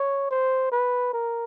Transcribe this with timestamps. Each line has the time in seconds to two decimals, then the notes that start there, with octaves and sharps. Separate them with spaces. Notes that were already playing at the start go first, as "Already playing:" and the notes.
Already playing: C#5
0.30 C5
0.72 B4
1.13 A#4